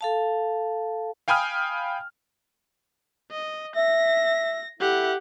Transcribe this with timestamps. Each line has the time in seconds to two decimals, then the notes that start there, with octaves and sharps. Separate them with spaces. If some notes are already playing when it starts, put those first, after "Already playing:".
0.01 A4 F5 A5
1.28 F5 G5 G#5 B5 D#6 F6
3.32 D#5
3.76 E5 A#6
4.80 E4 G4 A4 E5 F#5